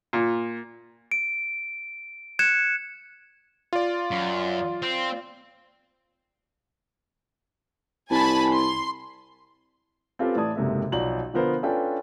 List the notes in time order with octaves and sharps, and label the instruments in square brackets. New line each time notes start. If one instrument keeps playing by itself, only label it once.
[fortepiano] A#2
[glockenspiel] D7
F#6 G#6 C#7 E7
[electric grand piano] F4 D5
[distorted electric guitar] F#2
C4
[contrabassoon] C2 [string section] G#5 A5 B5
[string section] C6
[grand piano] C4 C#4 F4 G4 A4 B4
A2 E3 D5 A5 D#6 G#6
F#1 G#2 C3 A#3 A4 E5
B1 F3 F#4 D5 A#5 F#7
D3 F3 B3 A#4 C5
C#4 D4 F4 A4 B4 G5